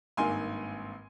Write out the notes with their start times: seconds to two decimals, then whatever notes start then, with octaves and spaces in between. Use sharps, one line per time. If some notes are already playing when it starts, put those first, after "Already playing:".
0.17 G#1 G2 D#3 A#3 G#5 C6